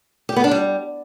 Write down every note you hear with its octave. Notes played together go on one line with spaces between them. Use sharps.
G4
B3
D4
G3